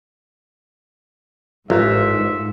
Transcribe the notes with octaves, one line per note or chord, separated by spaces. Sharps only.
A1 G#2 F4 A#4 E5